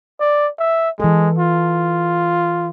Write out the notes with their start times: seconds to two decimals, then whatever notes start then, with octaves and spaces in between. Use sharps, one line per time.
0.20 D5
0.59 E5
1.00 E3 G#3 A4
1.39 F4